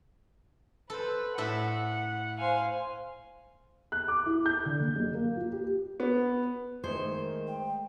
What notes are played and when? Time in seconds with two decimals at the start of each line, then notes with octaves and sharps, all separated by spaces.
0.90 A4 B4 C5
1.38 A2 A4 E5 F#5
2.38 C5 F5 G#5
3.92 F#6
4.08 D6
4.26 E4
4.46 G6
4.66 D3
4.79 A#1
4.95 F#1
5.14 A#3
5.37 F4
5.52 G4
6.00 B3
6.84 D#3 G#3 A3 C5
7.47 G5